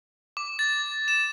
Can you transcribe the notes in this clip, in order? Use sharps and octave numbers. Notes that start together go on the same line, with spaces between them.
D6
A6
E7